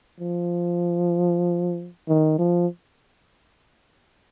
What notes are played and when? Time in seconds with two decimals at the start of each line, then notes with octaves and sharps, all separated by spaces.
0.20 F3
2.08 D#3
2.39 F3